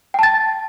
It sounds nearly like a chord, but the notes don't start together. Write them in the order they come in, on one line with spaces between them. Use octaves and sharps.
G5 A5 A6